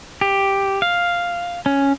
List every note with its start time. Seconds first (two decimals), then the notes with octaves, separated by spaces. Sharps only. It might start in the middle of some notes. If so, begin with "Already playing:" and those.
0.21 G4
0.82 F5
1.66 C#4